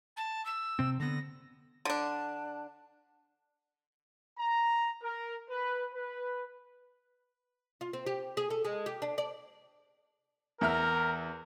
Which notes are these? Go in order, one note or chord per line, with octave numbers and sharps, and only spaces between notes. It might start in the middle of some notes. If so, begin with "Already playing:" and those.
A5
E6
C3 C4
D3 B3 A#6
D3 D4
A#5
A#4
B4
B4
F4
C4
G4
G#4
A4
G#3
G4
D4
D5
E2 A#4 E5 F6